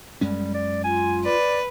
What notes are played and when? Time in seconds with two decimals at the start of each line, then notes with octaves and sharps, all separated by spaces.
0.21 F#2 G3 G#3 C#4
0.54 D5
0.84 F4 G#5
1.25 B4 D5